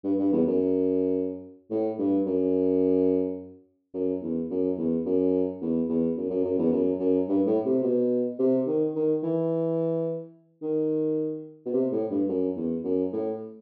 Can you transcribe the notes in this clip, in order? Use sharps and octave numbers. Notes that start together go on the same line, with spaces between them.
G2
G2
E2
F#2
A2
G2
F#2
F#2
E2
F#2
E2
F#2
E2
E2
F#2
F#2
F#2
E2
F#2
F#2
G2
A2
C3
B2
C3
D#3
D#3
E3
D#3
B2
C3
A2
G2
F#2
E2
F#2
A2